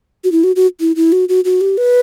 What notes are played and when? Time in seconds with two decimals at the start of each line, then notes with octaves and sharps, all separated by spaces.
0.24 F#4
0.32 E4
0.44 F#4
0.56 F#4
0.80 E4
0.96 E4
1.12 F#4
1.29 F#4
1.45 F#4
1.61 G4
1.78 B4